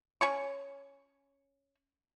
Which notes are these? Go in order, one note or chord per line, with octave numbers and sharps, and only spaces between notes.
C#4 C#5 C#6